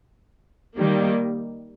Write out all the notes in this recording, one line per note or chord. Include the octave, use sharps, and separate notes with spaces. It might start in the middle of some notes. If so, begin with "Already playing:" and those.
D#3 G3 A#3